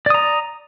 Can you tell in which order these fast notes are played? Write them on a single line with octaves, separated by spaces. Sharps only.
D5 D#6 A#5